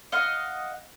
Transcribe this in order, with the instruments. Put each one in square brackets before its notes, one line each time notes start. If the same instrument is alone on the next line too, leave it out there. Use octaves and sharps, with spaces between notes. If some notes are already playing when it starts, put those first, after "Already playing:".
[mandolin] D#5 F5 F#5